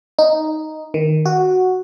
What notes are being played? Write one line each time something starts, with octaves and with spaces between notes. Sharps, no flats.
D#4
D#3
F#4